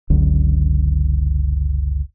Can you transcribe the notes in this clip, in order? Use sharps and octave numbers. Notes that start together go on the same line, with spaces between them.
F#1 C#2 D3 F#3